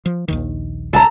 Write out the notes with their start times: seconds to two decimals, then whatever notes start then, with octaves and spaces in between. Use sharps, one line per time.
0.06 F3
0.28 A#1 D#2 D#3
0.93 B1 C#3 A4 A5 A#5